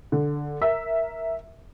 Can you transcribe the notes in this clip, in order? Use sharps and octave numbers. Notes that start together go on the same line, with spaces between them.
D3
A#4 E5 E6